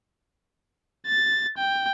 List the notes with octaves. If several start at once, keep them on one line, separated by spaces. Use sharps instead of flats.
A6
G5